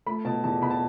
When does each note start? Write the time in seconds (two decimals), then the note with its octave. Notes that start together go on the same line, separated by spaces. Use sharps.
0.06 A3 B5
0.25 B2 A5
0.44 E2 A5
0.62 B2 B5
0.71 A5